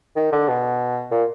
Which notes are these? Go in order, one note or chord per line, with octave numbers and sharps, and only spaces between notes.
D#3
D3
B2
A#2